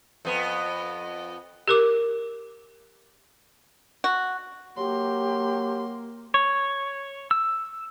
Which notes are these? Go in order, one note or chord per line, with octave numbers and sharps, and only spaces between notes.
F2 B3
G4 A#4 D6
F#4
F#3 A#3 G4 C6
C#5
E6